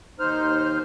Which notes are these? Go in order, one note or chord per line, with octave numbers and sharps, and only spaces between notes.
D#2 D#4 C5 F6